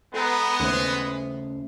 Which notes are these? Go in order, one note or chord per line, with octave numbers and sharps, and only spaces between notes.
G#3 B3 A4 A#5
D#2 C#3 A3 C5